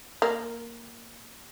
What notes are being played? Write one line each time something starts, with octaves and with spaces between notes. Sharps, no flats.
A#3